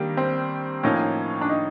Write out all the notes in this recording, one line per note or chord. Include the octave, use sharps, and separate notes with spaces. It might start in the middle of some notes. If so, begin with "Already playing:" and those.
Already playing: D#3 G3 A#3 D4 G4
C4
A2 F3 A#3 C#4 D#4
D4
D#4